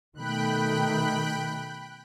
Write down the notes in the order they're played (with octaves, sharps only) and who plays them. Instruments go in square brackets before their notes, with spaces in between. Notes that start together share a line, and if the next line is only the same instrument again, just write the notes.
[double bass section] B2 D#3 A3 [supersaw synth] G5 B5 F#6